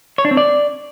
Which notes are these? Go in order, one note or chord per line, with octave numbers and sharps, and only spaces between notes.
C#5
D4
C4
D5